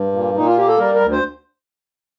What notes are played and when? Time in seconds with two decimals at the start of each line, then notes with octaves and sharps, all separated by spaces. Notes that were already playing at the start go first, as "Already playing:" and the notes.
Already playing: G2
0.12 A#2
0.34 A#2 D#4
0.47 F4
0.57 A#3 G4
0.68 A4
0.78 G3 A#4
0.95 A#4
1.01 D2
1.12 C5